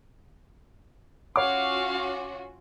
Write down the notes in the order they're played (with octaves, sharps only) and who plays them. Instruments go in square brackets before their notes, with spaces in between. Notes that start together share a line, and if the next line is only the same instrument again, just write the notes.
[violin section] C#4 F4 F#4 [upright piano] C#5 D6 [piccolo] F5 [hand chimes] F#5